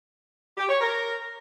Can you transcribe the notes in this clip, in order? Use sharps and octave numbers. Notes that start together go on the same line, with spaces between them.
G4
C#5
A#4